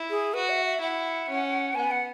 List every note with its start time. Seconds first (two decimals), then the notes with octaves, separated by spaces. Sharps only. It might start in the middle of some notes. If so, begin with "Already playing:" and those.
Already playing: E4
0.10 G#4
0.34 F#4 B4
0.49 E5
0.65 E5
0.81 E4 F#5
1.29 C#4
1.75 B3 G#5
1.91 F#5